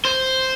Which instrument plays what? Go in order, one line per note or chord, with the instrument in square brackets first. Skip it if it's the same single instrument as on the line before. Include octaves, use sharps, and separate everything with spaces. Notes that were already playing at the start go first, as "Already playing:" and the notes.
[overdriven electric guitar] C5